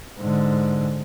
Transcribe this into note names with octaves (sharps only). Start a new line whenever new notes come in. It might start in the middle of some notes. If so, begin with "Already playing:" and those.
G#2 D3